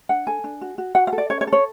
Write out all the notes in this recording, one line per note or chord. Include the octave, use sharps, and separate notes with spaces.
D4 F#5
A4 G#5
D4
F#4
F#4
F#4 F#5
F5
A4
D5
C#4 C#5
C#5
A4
C#5